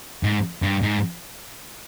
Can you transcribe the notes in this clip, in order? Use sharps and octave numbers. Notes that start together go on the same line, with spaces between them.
G#2
G2
G#2